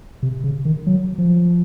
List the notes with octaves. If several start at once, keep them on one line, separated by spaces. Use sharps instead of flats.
C3
C#3
D#3
F#3
F3